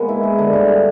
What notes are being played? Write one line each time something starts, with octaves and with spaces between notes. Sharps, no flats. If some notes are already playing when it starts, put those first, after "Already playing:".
Already playing: G#3 A#3 B3
E4
G#4
D3
G2